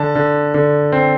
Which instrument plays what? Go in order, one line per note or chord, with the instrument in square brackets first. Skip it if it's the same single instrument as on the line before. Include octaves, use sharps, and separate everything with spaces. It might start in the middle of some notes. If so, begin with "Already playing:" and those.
Already playing: [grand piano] D3 A5
D3
D3
C4